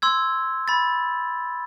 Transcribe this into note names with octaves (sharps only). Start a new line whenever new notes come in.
C6 E6 G#6
B5 A6